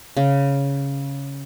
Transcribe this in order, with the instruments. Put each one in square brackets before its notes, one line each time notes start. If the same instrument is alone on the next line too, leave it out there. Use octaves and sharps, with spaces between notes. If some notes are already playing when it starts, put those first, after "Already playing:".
[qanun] C#3